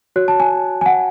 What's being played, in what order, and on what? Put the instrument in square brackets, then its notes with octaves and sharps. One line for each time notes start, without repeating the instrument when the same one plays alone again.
[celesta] F#4 C#5 F#6
A5
G#5
G#5
F#5